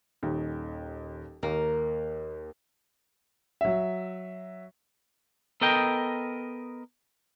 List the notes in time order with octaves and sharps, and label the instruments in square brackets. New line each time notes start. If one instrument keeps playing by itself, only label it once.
[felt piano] D#1 D#2 D#4
[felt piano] D#2 [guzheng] A#3
[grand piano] F#3 E5
[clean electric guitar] B3 A4 A#4 D#5 G5